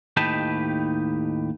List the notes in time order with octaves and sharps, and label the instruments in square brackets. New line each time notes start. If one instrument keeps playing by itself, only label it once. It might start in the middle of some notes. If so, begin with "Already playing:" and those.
[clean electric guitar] D#2 A2 D#4 G4 B4 A5